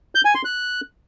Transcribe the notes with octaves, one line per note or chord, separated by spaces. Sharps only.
G6
G#5
C6
F#6